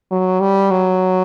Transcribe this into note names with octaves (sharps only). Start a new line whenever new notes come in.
F#3
G3
F#3